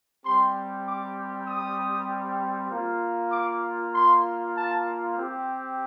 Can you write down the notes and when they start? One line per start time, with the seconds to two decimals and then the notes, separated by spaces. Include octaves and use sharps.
0.24 G3 C4 G4 C6
0.86 D6
1.48 D#6
2.71 A#3 F4
3.32 D6
3.94 C6
4.56 A5
5.17 C4 G4